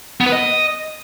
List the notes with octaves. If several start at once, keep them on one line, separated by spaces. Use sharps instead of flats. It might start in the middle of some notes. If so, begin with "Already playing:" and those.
B3
B4
D#5